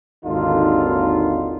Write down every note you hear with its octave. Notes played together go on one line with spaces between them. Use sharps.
G#1 D#2 D3 D#4 F4